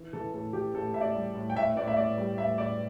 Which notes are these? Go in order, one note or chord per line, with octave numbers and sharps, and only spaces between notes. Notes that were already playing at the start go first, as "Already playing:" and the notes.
Already playing: E3
E3 A4
A2 A4
E3 G4
A2 A4
A2 E5
D5
G3
A2
G5
A2 E5
A2 D5
E5
A2 D5
G3
A2 E5
A2 D5